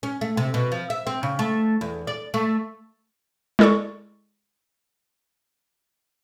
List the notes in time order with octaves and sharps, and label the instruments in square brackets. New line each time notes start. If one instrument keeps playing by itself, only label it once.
[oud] C#4
A3
C3
B2
F3
E5
C4
C#3
A3
E2
D5
A3
[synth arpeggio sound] G#3 E4 A4 D5 C#6